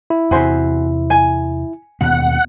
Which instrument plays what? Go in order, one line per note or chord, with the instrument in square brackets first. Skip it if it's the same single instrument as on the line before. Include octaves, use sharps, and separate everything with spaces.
[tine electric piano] E4
[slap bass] E2 C3 [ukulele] F#4 G#4 C5
[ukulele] G#5
[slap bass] D#2 B2 B3 [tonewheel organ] F#5